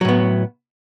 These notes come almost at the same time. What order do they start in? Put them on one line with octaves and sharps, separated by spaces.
F#3 A2 B3